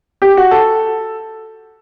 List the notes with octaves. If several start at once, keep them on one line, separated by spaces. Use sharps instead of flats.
G4
F#4
A4